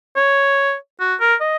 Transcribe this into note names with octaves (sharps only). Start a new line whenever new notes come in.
C#5
F#4
A#4
D#5